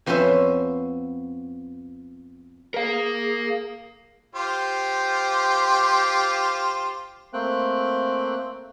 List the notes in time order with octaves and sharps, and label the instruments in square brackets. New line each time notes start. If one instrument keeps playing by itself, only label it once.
[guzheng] F2 F3 B3 C#4 C5 E5
[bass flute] G#4 [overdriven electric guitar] A#4 F5
[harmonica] F4 G4 C5
[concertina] A3 A#3 C4 G5 F#6